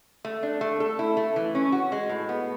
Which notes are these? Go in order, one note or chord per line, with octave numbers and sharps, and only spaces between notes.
A3
D4
A3
A4
E4
A3
E3
C#4
F#4
G#3
A2
B3